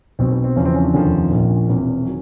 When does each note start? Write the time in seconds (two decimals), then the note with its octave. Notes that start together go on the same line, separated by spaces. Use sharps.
0.19 B1 B2 F#3 C4
0.32 B3
0.44 C4
0.56 E2 C#3 F3 C#4
0.65 C4
0.75 C#4
0.85 D4
0.93 F1 D#2 D3 F3 C#4
1.31 A#1 A#2 F3
1.68 E1 E2 C3
2.05 D#3 F#3